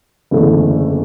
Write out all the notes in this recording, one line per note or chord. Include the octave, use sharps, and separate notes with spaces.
F#1 E2 D3 A3 E4